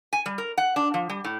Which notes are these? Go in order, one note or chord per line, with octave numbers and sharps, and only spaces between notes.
G#5
G3
A#4
F#5
D4
F3
G3
A2